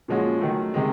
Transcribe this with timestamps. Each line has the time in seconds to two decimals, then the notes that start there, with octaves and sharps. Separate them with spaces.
0.08 A#2 F3 G#3 C#4 F#4
0.41 D#3 F#3 A3
0.74 C3 D#3 G#3